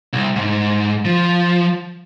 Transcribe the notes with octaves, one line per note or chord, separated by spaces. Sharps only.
C2
G#2
F3